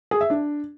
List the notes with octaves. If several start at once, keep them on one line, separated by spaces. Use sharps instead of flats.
G#4
E5
D4